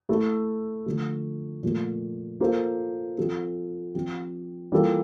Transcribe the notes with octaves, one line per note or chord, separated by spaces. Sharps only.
A3 E4 A4
D3 F3 A3
A#2 F3 A3
A#3 F4 A4 C5
F3 C4 F4 A4
F3 C4 G4
E3 G3 A#3 F4 A4